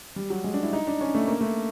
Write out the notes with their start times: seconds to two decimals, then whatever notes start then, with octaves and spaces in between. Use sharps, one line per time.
0.16 G3
0.30 F#3
0.44 G#3
0.54 D4
0.63 E4
0.73 D#4
0.87 D4
1.01 C#4
1.15 A3
1.28 A#3
1.41 A3